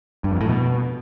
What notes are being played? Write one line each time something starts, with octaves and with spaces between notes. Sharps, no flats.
G2
F2
A2
B2